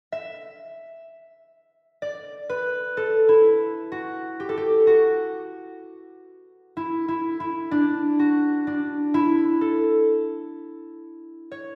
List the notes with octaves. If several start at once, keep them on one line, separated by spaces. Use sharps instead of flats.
E5
D5
B4
A4
E4
F#4
G4
A4
G4
F#4
E4
E4
E4
D4
F#4
D4
E4
A4
C#5